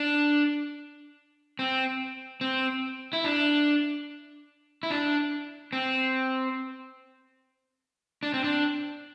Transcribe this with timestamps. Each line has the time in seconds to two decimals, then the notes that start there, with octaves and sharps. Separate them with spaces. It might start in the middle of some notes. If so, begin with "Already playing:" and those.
Already playing: D4
1.59 C4
2.41 C4
3.13 E4
3.24 D4
4.83 E4
4.90 D4
5.73 C4
8.23 D4
8.34 C4
8.44 D4